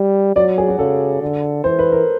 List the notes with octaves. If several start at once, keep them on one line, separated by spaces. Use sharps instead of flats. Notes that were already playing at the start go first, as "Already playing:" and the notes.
Already playing: G3
F#3 D5
G#4
F#4
C#3 A4
D3
E3 C5
B4
A#4